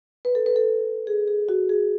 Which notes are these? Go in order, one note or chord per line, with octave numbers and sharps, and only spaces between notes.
B4
A4
B4
A4
G#4
G#4
F#4
G#4